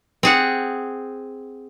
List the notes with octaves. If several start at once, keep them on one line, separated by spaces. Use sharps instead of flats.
C4 G#4 F#5